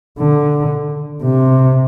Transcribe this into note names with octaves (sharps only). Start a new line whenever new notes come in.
D3
C3